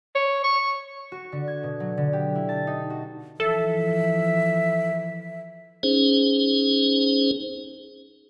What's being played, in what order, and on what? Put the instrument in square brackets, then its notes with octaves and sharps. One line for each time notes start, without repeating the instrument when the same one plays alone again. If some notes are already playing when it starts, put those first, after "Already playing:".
[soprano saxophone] C#5
C#6
[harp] F#4
D3
G#6
B2
F#3
D3
G4
E4
A5
D#4
F#4
[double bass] E3 F3 [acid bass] A4 [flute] E5
[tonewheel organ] C#4 D#4 G#4 C5